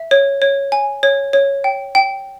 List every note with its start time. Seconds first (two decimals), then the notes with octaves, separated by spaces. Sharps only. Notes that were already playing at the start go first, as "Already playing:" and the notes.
Already playing: E5
0.11 C#5
0.42 C#5
0.72 G#5
1.03 C#5
1.33 C#5
1.64 G5
1.95 G5